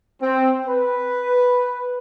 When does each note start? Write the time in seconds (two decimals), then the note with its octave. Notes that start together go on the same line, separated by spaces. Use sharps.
0.21 C4
0.67 B4